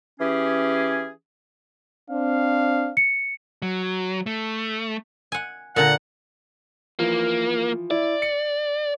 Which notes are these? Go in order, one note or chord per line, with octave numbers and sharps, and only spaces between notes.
E3 C#4 G4 G#4
C4 D4 F5
C#7
F#3
A3
F#5 G#5
A#2 D3 F#5 A#5
E3 F3 A#3
E4 D5
C#7